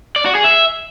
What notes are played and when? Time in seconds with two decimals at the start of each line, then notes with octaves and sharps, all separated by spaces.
0.16 D5
0.25 F#4
0.35 G#4
0.44 E5